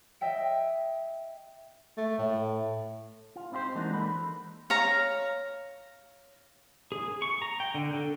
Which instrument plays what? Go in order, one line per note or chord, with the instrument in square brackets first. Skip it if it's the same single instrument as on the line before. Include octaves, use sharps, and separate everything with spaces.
[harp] D#5 E5 G5 D7
[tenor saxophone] A3
A2
[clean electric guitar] F4
C4 D#4 E4 G4 C5
E3 G#3 A#3 D4 D#4 F#4
E3 A4 B5
[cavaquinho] C#5 F5 A#5
[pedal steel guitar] G#4
C#6
A#5
G5
D3
A4